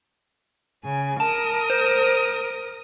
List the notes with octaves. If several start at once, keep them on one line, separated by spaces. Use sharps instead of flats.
C#3 G#5
A#4 A5 D#6
C5